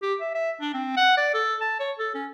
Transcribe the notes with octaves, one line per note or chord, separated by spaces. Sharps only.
G4
E5
E5
D4
C4
F#5
D5
A4
A5
C#5
A4
C#4